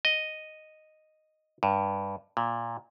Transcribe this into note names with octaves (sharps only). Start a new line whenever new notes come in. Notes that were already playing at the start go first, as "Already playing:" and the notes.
D#5
G2
A#2